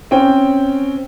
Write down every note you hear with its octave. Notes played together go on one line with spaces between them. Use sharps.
C4 C#4 G5